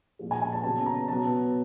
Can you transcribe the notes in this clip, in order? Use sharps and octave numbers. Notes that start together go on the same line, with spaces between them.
A#2 F3 G#3
G#5
G#5
A5
C#3 F#3 B3 A5
A#5
B2 F#3 B3 A5